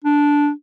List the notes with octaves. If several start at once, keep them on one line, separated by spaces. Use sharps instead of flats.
D4